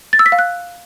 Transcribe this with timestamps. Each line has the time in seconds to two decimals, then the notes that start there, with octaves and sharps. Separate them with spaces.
0.13 A6
0.19 E6
0.26 B6
0.32 F5
0.39 F#6